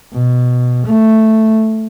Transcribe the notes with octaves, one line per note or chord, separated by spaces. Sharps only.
B2
A3